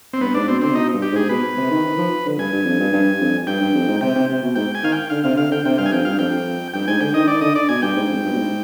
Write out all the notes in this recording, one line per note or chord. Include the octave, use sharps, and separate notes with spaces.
C4
G2 B3
G#2 D4
B2 C4
D3 C4
C3
B2 D#4
G2
G4
G#2 G#4
B2 B4
C3
D#3
D#3
F3
D3
G2 G#5
G2
F2
G2
G2
F2
G2 G5
G2
F2
G#2
C3 G5
C3
C3
B2
G#2 G5
G#5
D#3 F5
G5
D3 F5
C3 F5
D3 F5
D3 G5
C3 G5
G2 F5
G#5
F2 G5
G2 F5
F2 G5
G2 G5
G#2 G#5
D3 G5
D#3 D#5
D#3 D5
D3 D#5
D5
B2 G#5
G2 G5
G#2
F2
G#2
G2
B2
G#2